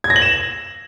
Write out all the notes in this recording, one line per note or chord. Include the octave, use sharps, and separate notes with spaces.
G#6
A#6
F#7
E7